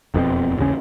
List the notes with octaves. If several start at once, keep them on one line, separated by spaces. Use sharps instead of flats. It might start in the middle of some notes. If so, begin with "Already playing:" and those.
E1 F2 B2 C4
A1 D#2 C#3 C#4